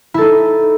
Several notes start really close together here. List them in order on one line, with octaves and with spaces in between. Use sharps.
E4 A4 D#4